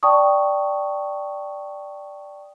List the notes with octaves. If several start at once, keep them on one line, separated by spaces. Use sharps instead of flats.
D5 G5 A5 C#6 D#6